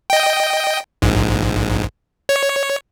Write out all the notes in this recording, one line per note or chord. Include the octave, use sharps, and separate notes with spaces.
D#5 G5
A#1 G#2
C#5